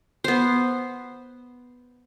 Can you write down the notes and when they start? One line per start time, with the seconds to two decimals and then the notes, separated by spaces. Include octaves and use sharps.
0.24 B3 C5